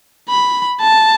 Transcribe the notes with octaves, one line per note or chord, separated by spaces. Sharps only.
B5
A5